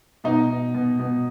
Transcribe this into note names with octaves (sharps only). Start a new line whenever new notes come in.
B2 D#4
B2
B2
B2